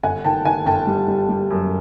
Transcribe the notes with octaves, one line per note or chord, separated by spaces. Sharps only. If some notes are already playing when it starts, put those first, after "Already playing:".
G1 F#5 G#5
D#3 G5 A5
D#3 F#5 G#5
G1 G5 A5
G3
G3
G3
F#2